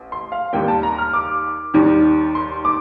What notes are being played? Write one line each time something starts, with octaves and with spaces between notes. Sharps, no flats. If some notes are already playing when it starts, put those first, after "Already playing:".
Already playing: A1
C6
F5
D#2 D#3 G3 A#3 G5
A5
A#5
F6
D6
D#2 D#3 G3
C6
D6